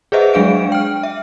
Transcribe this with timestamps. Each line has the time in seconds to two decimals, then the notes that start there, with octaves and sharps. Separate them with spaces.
0.12 G#4 B4 C5 D#5 E5 F#5
0.34 F#3 G#3 D4 G#4 F5 D7
0.72 G5 F6
1.03 E5